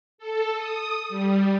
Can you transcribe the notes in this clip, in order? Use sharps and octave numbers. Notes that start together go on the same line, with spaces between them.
A4
D#6
G3